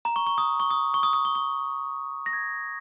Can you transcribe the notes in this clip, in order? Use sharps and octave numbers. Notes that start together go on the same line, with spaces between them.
A#5
C#6
C#6
D#6
C#6
D#6
C#6
D#6
D#6
C#6
C#6
A#6
G#6